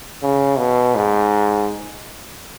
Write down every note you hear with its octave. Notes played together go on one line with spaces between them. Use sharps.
C#3
B2
G#2